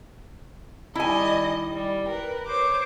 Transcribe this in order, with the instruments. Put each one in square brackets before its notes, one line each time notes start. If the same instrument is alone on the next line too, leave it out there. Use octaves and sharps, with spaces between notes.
[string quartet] D#3 G3 D#5 [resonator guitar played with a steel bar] E4 G#5
[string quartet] G3
A#4 B4
C5 C#5 D6